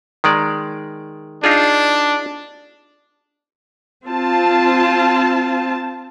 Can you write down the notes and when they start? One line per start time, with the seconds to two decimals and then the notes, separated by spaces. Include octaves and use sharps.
0.24 D#3 G#3 D5
1.44 D4 D#4 F4 G#4
4.04 C4 F4 A5